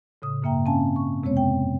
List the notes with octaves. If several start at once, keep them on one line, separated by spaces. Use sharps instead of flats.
A2 C#3 D#6
G2 C#3 A#3 E5 G5 A#5
C4 C#4 F5 G#5 A5
C#6
F2 C3 G#3 B3 C4 C#5
G5